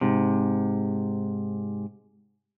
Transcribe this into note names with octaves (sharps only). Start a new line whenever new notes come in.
G#2 C3